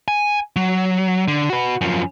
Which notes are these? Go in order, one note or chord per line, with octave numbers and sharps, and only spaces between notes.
G#5
F#3
D3
F#4 B4
F#2 F3